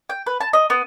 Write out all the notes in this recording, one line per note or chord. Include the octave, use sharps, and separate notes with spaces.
G5
B4
A5
D#5
B3